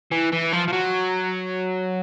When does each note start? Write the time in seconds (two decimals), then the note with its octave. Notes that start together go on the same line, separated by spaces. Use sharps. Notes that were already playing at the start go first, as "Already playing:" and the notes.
0.12 E3
0.32 E3
0.53 F3
0.68 F3
0.73 F#3